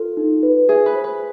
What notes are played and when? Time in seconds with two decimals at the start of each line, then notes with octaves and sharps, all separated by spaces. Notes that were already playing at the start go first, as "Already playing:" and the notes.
Already playing: F4 A4
0.17 D#4
0.43 B4
0.69 G#4 E5
0.86 B4
0.95 C5
1.04 B4